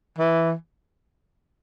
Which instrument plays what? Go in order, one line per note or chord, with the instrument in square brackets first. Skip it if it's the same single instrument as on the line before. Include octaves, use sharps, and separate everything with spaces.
[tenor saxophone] E3